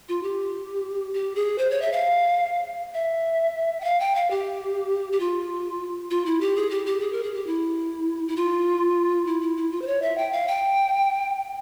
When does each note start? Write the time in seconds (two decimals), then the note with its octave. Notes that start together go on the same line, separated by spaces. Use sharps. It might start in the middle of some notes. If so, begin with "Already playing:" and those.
0.09 F4
0.23 G4
1.14 G4
1.36 G#4
1.58 C5
1.71 C#5
1.82 E5
1.92 F5
2.94 E5
3.81 G5
3.84 F5
4.00 G5
4.15 F5
4.30 G4
5.13 G4
5.20 F4
6.11 F4
6.26 E4
6.41 G4
6.56 G#4
6.70 G4
6.86 G4
7.01 G#4
7.12 A#4
7.23 G#4
7.34 G4
7.47 E4
8.28 E4
8.36 F4
9.27 E4
9.41 E4
9.57 E4
9.71 F4
9.82 C5
9.87 C#5
10.02 E5
10.18 G5
10.33 F5
10.48 G5